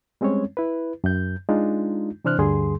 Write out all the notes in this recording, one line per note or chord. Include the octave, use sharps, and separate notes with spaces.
G3 G#3 C4 C#4 C#5
E4 B4
F#2 G6
G#3 D4 D#4 F4
C3 E3 D4 C5 F6 F#6
D2 G2 D3 G3 G#4 C6